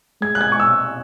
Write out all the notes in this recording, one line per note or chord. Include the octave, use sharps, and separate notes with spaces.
G#3 G#6
F#6
G#6
C#6
E6